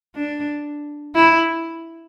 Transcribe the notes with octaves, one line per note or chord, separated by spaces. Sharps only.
D4
E4